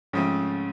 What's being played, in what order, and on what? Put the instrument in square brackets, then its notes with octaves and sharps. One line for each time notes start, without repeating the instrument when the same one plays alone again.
[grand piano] G#2 F3 A3 C4 [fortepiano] C#3